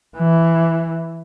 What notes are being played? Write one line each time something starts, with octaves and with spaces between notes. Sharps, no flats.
E3